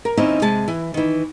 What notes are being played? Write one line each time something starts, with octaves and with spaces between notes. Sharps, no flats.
A#4
D#2 C4 C#4 D#4 E4
C3 G#3 A5
E3
D#3 E3